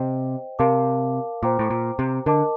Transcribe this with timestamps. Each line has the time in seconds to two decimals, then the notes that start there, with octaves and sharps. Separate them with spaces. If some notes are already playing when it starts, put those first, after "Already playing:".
Already playing: C3 C5 D#5 G5
0.59 C3 A#4 F5 A5 D6
1.43 A#2 C5 G5 A#5 D6
1.59 A2
1.70 A#2
1.99 C3
2.26 D3 A#4 D#5 A5 D6